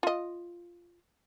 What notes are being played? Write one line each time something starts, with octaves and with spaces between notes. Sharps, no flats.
F4 D#5